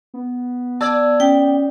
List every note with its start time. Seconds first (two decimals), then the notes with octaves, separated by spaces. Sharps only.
0.14 B3
0.81 D5 A5 E6 G#6
1.20 C#4 G5